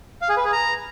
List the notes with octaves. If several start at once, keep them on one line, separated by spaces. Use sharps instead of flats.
F5
G#4
B4
G#4
A#5